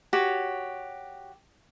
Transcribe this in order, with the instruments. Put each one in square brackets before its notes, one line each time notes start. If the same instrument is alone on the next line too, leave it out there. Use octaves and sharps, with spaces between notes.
[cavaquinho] F#4 G4 C#5